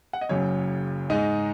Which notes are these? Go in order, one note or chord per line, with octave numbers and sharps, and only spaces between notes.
F#5
D#5
F#1 F#2 C#3 F#3 C#5
G#2 G#3 D#4 D#5